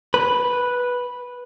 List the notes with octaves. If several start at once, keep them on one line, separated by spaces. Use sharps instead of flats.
B4